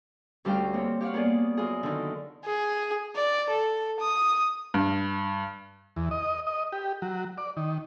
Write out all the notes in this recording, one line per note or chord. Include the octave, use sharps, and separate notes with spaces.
D2 G3 C#4 F5 G5
A#3 C4 C#5
G4 C#5 F5 F#5
A#3 B3 C#4 G#4 D5
F#2 F4 G#4
D3 D#3
G#4
D5
A4
D#6
G2
E2
D#5
D#5
G4
F#3
D5
D#3